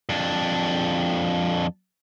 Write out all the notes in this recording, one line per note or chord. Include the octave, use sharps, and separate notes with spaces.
F2 D4